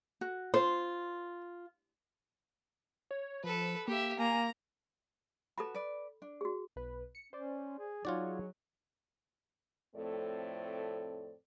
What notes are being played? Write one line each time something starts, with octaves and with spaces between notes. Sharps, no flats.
F#4
F4 C5
C#5
F3 A4 B4
A#3 G4 E5
A#3 G#5 A#5
F#4 A4 B4 A5 B5
B4 D5
D4
F#4 G#4
B1 B4
C#7
C#4 C5 D5
G#4
F#3 D#4 F4 F#4 G#4 C#5 D5
F2 A2 A3 C4 A4 D5